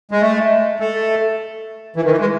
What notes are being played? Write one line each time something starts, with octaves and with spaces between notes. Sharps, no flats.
G#3
A3
A3
E3
D#3
E3
G#3